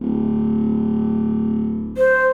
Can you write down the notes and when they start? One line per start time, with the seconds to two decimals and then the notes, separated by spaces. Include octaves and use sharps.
0.01 D1
1.97 C5